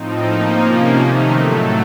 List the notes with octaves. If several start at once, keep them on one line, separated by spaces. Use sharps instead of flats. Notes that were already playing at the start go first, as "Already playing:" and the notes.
Already playing: A2 F3 C4 D#4
F3 A#3 D#4
C3 F3 A#3 C#4
C3 D#3 A3 D#4
A2 F#3 A3